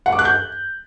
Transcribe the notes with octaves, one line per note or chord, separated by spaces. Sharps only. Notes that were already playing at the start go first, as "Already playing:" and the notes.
F#5
D6
F#6
G6